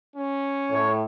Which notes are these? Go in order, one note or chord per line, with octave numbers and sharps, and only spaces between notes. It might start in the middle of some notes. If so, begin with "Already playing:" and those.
C#4
A2 C#5